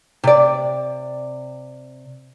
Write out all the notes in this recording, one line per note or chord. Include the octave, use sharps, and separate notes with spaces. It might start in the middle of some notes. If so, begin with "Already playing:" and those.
C3 D5